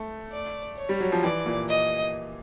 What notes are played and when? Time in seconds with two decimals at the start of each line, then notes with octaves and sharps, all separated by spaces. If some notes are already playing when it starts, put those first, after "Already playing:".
Already playing: A3
0.32 D5
0.77 C#5
0.89 G3
1.00 F#3
1.12 F3
1.23 E3 D5
1.46 A#2
1.69 D#5